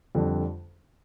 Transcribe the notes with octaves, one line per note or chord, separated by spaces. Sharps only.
F2 D3 G3 D4